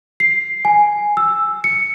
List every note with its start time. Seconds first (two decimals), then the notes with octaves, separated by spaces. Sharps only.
0.20 C7
0.65 G#5
1.17 E6
1.64 C#7